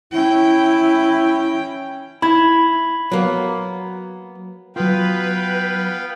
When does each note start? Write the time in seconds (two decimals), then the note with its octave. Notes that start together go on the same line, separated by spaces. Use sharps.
0.12 C#4 E4 G5
2.22 E4 B5 G#6
3.12 F#3 A#3 B3
4.76 F#3 B3 F4 B4 F5 G5